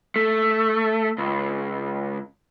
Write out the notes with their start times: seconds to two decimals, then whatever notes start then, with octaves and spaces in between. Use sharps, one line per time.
0.16 A3
1.18 C#2